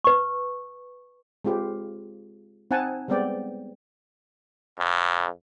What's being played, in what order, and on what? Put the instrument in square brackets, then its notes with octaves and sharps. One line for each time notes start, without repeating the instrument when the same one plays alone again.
[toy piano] B4 C#6
[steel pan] G#3 C4 F4 G4 B4
C4 D#4 F#5 G#5 A5
G3 G#3 B3 C4 D5 G5
[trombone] F2